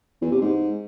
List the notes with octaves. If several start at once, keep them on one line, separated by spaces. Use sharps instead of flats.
E2
C3
G#2